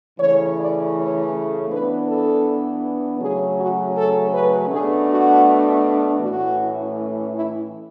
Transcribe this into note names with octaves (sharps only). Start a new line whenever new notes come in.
C#3 E3 A3 C#4 C#5
D5
C#5
E3 B3 D4 B4
A4
C#3 F#3 A3 C#4 G#4
F#4
A4
B4
B2 A3 D4 G#4
F#4
A2 E3 A3 C#4 F#4
E4